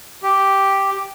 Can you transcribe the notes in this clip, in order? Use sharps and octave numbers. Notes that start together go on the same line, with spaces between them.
G4